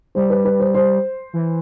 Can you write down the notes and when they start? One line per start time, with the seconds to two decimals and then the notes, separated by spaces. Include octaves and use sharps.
0.15 G3 C5
0.30 B4
0.45 B4
0.60 C5
0.74 C5
1.33 E3